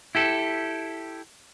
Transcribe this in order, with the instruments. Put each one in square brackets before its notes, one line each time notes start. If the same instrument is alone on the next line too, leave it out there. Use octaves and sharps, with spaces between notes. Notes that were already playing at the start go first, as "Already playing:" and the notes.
[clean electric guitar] E4 G4 A4